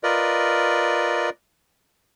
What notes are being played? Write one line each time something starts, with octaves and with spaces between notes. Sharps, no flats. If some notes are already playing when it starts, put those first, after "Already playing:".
F4 A#4 B4 D5 D#5